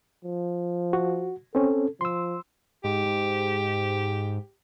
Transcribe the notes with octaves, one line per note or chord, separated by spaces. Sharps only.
F3
F#4
C4 C#4 A4
F3 C6 E6
G#2 G4
G#2